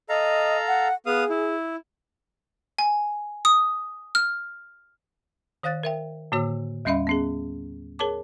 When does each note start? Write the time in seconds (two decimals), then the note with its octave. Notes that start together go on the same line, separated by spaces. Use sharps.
0.09 A4 D#5 F5 A#5
0.68 F#5
1.06 B3 G#4 F5 D#6
1.30 E4
2.79 G#5
3.45 D#6
4.15 F6
5.63 D#3 C5 F5 F#6 A6
5.83 A#4 E5 G5
6.32 A2 D3 A#3 F#4 C#5 E6
6.85 D#2 G3 C#4 D#5 E5 B5
7.07 B3 C#4 G#4
7.99 G#4 A#4 C#5 A5 D6